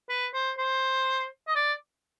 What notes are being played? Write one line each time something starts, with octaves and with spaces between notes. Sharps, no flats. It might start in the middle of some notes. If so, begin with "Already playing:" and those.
B4
C5
C5
D#5
D5